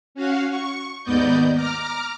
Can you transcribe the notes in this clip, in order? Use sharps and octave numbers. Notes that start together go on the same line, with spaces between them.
C#4 F#4 F5 F#5
C#6
D#2 G#2 B3 D5 D#5 G6
A#5 D6 F6